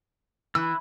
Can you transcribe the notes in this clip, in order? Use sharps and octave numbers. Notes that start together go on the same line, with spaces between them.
E3 E6 F#6